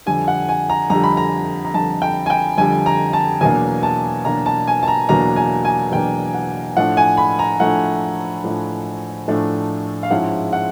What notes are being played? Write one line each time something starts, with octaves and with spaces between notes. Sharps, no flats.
F2 D3 G3 G#5
F#5
G#5
A#5
F2 D3 G3 A#5
B5
A#5
A#5
F2 D3 G3 A5
G5
G#5
G5
F2 D3 G3 G#5
A#5
A5
E2 B2 F#3 A#3 D4 G#5
A5
E2 B2 F#3 A#3 D4 A#5
A5
G#5
A5
A#5
E2 B2 F#3 A#3 D4 A#5
G#5
G#5
E2 B2 F#3 A#3 D4 G5
F#5
A2 F3 A3 D4 F#5
G#5
B5
A#5
A2 F3 A3 D4 F#5
A2 F3 A3 D4
A2 F3 A3 D4
F5
G#2 F3 G#3 C#4 E4 F#5
F#5